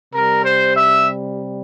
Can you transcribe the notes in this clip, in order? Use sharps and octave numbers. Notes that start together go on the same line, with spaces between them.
C3 G3 A#4
C5
E5